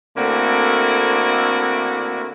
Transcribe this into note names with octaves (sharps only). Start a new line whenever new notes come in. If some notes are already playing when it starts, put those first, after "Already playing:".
D3 A3 A#3 C4 E4 F#4